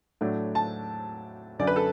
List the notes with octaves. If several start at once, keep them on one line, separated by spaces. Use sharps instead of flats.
A2 F#3 A3 D4
A5
F#2 D3 F#3 D5
B4
A4